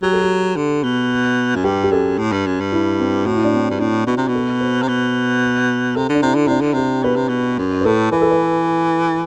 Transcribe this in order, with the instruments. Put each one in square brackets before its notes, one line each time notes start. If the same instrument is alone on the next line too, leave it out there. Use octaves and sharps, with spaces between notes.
[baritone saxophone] F#3 [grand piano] G4
[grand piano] A4
G4
[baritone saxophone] D3
B2
F#2
[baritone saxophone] G2 [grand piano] G4
[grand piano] G4
[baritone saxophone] F#2 [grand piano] A4
[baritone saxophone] A2
G2
F#2
G2
[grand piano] E4
C4
[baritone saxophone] A2 [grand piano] F#4
[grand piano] E4
D4
C4
[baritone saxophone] G2
[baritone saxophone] A2 [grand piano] D4
[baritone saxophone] B2 [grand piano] F#4
[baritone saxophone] C3
B2
[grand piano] A4
C5
[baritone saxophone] C3
B2
[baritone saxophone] C3 [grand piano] A4
[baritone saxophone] D3
[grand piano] D4
[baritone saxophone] C3 [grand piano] E4
[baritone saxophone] D3
[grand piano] E4
[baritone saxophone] C3 [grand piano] D4
[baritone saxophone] D3
[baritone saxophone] C3 [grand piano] G4
[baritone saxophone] B2 [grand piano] B4
[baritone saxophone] C3
B2
F#2
[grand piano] B4
[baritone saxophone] A2 [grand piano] A4
[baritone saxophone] E3 [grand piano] B4
[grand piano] A4
B4